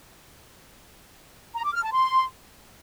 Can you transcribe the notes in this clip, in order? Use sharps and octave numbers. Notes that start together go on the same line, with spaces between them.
A#5
D6
F6
A5
C6